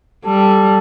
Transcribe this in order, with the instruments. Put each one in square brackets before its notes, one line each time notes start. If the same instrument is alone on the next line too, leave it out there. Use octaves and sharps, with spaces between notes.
[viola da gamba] G3 [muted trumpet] A4